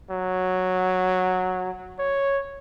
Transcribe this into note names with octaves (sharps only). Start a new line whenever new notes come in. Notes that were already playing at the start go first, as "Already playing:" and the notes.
F#3
C#5